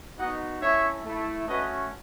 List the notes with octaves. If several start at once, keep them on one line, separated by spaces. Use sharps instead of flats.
B3 D#4 F#4 D#5 F#5
A3 C#4 E4 C#5 E5
A3 E4
A3 C#4 F#4 B4 D#5